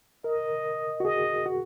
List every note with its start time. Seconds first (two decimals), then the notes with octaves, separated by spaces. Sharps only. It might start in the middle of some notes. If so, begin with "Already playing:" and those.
0.24 A#4 D#5
1.00 F#4
1.05 G#4 D#5
1.46 F#4